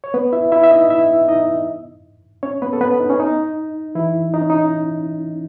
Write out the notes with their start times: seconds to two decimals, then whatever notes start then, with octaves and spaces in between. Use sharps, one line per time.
0.04 C#5
0.14 B3 B4
0.33 E4 E5
0.52 E4 E5
0.64 E5
0.71 D#4 D#5
0.90 E4 E5
1.28 D#4 D#5
2.43 C#4 C#5
2.62 B3 B4
2.73 A4
2.81 B3 B4
3.00 D#4
3.10 C#4
3.20 D#4
3.95 E3 E4
4.34 D#4
4.41 C#4
4.50 D#4